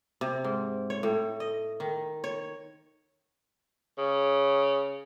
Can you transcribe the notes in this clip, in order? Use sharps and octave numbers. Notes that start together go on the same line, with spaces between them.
C3
G#2
C#5
A2
D#5
D#3
C#5
C#3